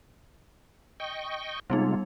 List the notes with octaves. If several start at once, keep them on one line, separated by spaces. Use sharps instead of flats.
D#5 G5 C#6
C3 G3 G#3 B3 D#4 F4